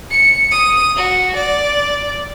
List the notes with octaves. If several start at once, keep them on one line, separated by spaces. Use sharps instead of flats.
C#7
D#6
F#4
D5